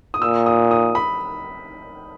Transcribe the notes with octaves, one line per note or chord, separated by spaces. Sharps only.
D#6
A#2 E6
D#6
D#6
B5